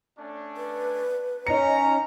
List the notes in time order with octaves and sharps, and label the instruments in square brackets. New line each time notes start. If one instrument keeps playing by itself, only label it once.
[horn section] A3 C#4 D4
[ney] B4
[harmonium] C#4 [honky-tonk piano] D#4 C#7 [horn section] A#5